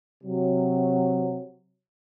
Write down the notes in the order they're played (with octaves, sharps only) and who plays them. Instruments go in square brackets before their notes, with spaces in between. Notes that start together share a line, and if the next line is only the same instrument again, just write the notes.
[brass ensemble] C3 F#3